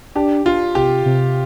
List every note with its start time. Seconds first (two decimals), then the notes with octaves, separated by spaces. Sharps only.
0.15 D4 G4
0.46 D4 F4
0.75 C3 G4
1.06 C3